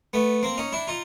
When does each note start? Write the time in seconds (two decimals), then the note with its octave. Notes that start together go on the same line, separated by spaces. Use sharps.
0.13 A3 B3
0.43 A#3 C4
0.57 C#4 D#4
0.73 D4 E4
0.88 D#4 F4